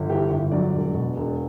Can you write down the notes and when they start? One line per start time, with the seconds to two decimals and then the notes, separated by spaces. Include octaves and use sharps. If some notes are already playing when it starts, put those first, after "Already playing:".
Already playing: G1
0.10 E3 G4
0.30 G1
0.52 F#3 D5
0.73 E1
0.94 B2
1.16 E1